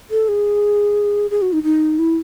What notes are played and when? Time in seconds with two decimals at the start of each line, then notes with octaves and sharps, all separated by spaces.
0.11 A4
0.28 G#4
1.31 G#4
1.42 F#4
1.53 D#4
1.63 D#4
1.99 E4